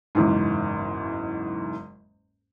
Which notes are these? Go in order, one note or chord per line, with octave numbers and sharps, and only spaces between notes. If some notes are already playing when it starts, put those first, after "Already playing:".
F#1 E2 G#2